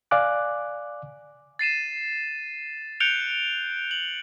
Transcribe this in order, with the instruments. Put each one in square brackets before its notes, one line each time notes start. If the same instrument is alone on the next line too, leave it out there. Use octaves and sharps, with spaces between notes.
[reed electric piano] D5 F5 G#5 D6 F#6
[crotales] A6 C7 D#7 E7
F#6 G6 C#7 D7 F7 G7
F#7